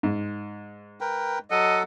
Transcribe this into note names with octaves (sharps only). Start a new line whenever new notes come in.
G#2
A#4 B4 G5
F#3 A4 D#5 F#5